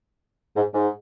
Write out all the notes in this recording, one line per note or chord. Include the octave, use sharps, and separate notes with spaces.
G#2
G#2